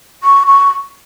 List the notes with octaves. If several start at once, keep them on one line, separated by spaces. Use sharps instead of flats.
C#6
C#6